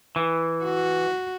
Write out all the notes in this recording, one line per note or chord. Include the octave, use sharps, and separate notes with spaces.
E3
F#4